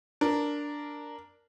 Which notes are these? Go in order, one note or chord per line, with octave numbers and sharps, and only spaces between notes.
D4 A#4